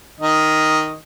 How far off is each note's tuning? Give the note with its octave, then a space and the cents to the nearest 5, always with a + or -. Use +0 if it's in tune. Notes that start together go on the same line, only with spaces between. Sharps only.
D#3 +0 D#5 +0